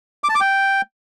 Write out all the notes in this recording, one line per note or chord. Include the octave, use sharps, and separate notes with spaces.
D6
A5
D6
G5